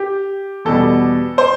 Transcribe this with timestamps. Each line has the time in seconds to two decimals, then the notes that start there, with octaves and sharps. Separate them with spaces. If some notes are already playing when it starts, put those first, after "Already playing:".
Already playing: G4
0.65 E2 B2 G3 A4
1.38 C5